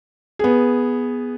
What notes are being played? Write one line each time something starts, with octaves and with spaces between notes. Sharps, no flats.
B3 G#4